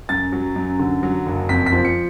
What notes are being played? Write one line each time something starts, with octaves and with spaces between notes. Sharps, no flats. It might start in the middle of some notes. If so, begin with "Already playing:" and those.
F#2 A6
F#3
F#2
D3
F#3
F#1
F2 B6
B6
F3
C#7